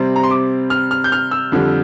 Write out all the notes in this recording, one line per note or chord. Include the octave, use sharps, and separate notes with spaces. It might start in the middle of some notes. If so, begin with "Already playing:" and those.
Already playing: C3 G3 C4
A#5
C6
D6
F6
F6
G6
F6
E6
F2 D3 G3